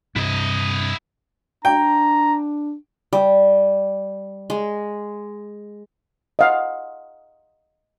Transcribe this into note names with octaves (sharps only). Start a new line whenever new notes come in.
G2 C3 E4 D#5
D4 G5 A#5
G3
G#3
D#5 F5 F#5